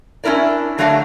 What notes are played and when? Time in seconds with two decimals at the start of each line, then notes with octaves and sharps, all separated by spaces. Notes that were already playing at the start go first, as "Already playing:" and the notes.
0.24 C#4 D4 E4 A#4 D5
0.78 D3 F#3 A3 D4 F#4 F5